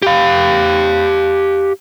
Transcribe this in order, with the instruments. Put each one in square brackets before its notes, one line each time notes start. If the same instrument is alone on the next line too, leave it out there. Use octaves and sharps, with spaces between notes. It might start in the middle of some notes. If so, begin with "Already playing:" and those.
[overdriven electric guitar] G4 F5